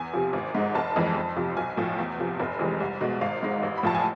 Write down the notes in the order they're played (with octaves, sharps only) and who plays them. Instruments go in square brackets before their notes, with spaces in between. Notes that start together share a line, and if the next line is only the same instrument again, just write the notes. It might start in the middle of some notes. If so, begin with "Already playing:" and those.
Already playing: [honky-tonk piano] E2 G#5
C3 F3
G#1
G#2 G#3
F1 A5
F2 E3 G#3
F2
C3 F3
B1 G#5
A2 F3
E2
C3 F3
F1
F2 C3 E3 G#3
C2
B2 G#3
G#1 F5
G#2 G#3
A1
B5
A2 F3 A5
G#5